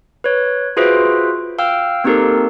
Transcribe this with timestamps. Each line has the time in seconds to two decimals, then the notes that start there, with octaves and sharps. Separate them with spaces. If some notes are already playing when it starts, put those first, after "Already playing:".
0.24 B4 C#5
0.77 F4 F#4 G#4 B4 C5 E5
1.59 F5 G5 E6 F6
2.04 A#3 C4 D#4 G4 A4 A#4